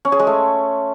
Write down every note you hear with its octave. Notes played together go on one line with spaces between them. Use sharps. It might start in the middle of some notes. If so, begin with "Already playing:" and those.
C#4
G#4
G#3
A3